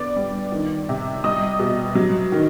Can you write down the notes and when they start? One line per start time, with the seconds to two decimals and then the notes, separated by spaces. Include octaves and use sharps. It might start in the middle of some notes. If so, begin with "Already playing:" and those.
Already playing: D3 B3 D5 D6
0.16 G3
0.52 D#3
0.89 C3
1.24 G3 D#5 D#6
1.59 B2
1.95 F#3
2.32 D#3